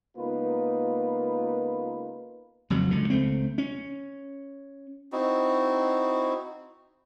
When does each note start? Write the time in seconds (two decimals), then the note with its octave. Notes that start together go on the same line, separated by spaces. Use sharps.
0.17 C#2 A#3 B3 D#4 F4 B4
2.70 F#1 F2 F#3
2.91 C#2 D3
3.10 C#2 A3 C4
3.58 C#4
5.12 C4 D#4 E4 F#4